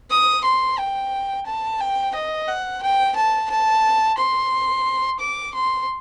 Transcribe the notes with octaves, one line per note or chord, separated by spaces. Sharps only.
D#6
C6
G5
A5
G5
D#5
F#5
G5
A5
A5
C6
D6
C6